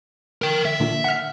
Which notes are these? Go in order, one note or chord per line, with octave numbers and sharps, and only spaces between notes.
A#4 G5
E5
A#2 D3
F#5 F6